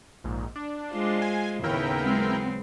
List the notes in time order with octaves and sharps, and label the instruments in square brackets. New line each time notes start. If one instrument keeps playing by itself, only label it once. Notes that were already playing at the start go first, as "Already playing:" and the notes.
[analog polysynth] A#1 G#2
D4
[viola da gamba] G#3 F4 C5
[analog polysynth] G#5
[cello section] D#2 A2 [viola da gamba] C#3 B3 [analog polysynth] E4 A#4 G5
[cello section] F#3 G#3 C4